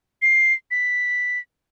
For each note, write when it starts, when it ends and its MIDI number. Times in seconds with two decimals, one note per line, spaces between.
0.22 0.53 96
0.71 1.39 95